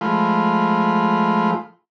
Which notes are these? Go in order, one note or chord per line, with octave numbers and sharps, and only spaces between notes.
F3 G#3 A3 F4 B5